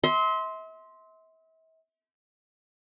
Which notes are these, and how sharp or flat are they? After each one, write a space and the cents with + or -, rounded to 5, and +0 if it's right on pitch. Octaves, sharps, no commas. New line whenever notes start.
E5 -40 C6 +0